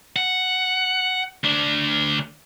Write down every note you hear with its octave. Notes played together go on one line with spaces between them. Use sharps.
F#5
D2 D4